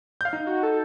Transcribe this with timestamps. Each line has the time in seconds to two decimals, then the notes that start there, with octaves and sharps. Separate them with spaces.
0.21 F5 G6
0.33 D#4
0.47 F#4
0.63 A4